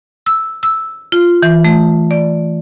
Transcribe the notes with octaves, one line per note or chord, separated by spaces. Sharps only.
E6
E6
F4
E3
A3
D5